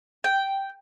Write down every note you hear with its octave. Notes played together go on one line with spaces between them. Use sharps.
G5